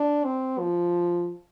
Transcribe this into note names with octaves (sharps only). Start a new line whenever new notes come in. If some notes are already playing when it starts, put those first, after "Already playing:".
Already playing: D4
C4
F3